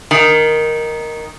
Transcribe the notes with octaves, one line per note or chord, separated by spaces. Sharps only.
D#3